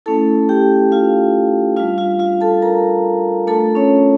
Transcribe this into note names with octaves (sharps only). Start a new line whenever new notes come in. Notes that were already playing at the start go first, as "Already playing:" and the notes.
A3 C#4 E4 A4 A5
G4 G5
F4 F5
G3 D4 F4 F5
F4 F5
F4 F5
A4 A5
A#4 A#5
A3 D4 F4 A4 A5
C#4 C#5